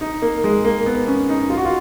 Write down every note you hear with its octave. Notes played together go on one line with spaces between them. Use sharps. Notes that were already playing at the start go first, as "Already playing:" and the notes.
D#4
A#3
G#3
A#3
B3
C#4
D#4
F4
F#4
F4